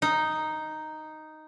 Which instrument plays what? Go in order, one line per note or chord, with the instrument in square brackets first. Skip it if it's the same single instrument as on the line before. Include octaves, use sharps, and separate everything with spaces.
[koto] D#4